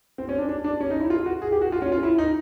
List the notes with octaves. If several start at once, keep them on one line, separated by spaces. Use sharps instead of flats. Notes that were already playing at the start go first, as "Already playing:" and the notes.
C4
C#4
D4
D4
D4
C#4
D#4
E4
F4
F#4
G#4
G4
F#4
F4
C#4
F4
E4
D#4